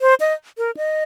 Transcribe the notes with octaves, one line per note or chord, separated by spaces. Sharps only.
C5
D#5
A#4
D#5